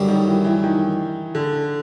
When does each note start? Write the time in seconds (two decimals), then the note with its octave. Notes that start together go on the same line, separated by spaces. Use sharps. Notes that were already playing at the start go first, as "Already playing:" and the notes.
Already playing: F#2 D3 G3
0.09 D#3
0.28 E3
0.45 E3
0.64 D#3
1.35 D3